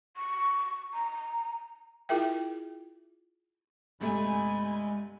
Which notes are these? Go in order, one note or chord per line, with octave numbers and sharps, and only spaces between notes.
C#6
A#5
E4 F4 G#4 A#4 E5 G5
G1 C2 G#3 A3 G#5 B5